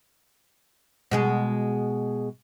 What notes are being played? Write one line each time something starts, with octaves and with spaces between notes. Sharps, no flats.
B2 G#3 G#4